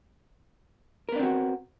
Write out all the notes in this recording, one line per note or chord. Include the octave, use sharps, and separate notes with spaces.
B3 C4 D4 F#4 A#4